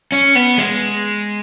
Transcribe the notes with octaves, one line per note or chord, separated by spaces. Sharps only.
C#4
B3
G#3